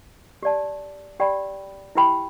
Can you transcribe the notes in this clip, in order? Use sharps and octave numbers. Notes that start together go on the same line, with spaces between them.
G4 D5 A5
G4 D5 G5 B5
E4 G4 B4 G5 B5